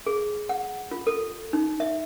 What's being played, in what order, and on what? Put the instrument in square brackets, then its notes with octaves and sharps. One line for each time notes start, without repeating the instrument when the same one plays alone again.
[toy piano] G#4
F#5
F4
A4
D#4
E5